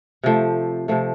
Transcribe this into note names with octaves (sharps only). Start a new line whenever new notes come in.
C3 F3 A3
C3 F3 A3